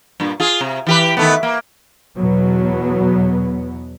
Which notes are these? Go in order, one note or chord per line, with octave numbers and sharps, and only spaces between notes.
G2 A#2
F4 G#4
C3
E3 G4 B4
D#3 A3 B3
A#3
E2 B2 F#3 B3